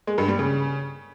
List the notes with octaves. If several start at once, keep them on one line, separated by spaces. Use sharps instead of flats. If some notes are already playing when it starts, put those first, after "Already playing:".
G#3
G2
G3
C#3